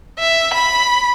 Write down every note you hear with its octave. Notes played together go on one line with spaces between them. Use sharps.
E5
B5